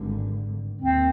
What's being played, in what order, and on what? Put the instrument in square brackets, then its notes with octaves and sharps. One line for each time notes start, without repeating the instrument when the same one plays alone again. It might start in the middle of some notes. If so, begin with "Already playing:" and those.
Already playing: [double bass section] G#1 G2 D3
[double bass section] D#2 [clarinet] C4